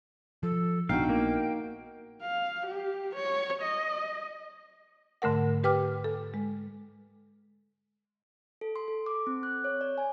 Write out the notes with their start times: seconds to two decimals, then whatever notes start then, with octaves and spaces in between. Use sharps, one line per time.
0.43 F3 A4
0.89 A#1 B3 D4 D#4 F#4 F5 G5
1.09 A#3
2.22 F5
2.67 G4
3.16 C#5
3.62 D#5
5.22 G#2 D3 A3 A#4 F#5
5.64 G4 B4 G5 D6 F6
6.04 A4
6.34 G#3
8.61 A4
8.76 C6
8.88 A4
9.06 D6
9.27 C4
9.43 F#6
9.64 C#5
9.81 D5
9.98 G#5